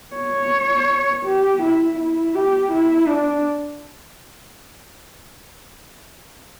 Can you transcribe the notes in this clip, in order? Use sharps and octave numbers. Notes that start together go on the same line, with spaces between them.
C#5
G4
E4
E4
G4
E4
D4